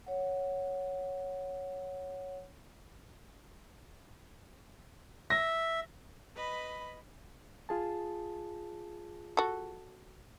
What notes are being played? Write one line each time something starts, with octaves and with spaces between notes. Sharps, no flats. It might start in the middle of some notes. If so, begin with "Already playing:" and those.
C#5 F#5
E5 A#6
B4 D#5 B5
F4 G#4 A5
F#4 A4